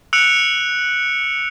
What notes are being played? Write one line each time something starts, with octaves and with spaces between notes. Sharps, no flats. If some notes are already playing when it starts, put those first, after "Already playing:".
E6 F#6 C#7 D7 F7